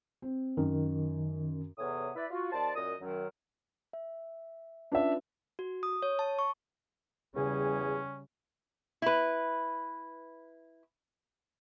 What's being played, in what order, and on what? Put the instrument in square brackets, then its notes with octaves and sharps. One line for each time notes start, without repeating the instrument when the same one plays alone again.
[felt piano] C4
[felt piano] F#2 [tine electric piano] D#3
[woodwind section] E2 A2 C3 B3 C#5 D#6
E4 B4 D5
F4 F#4
D#2 C5 D5 A5
F#2 A#2 D#5 D#6
F#2 D#3 F#3
[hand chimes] E5
[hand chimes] C#4 F4 B4 [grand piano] D4 E5
[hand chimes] F#4
D#6
C#5
A5
C#6
[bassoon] E2 [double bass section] C#3 G3 [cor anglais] C#4 [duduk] G#4
[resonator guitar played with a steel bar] E4 B4